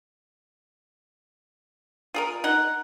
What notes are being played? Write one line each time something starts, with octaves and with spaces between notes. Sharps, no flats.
F4 G#4 A#4
D#4 F#5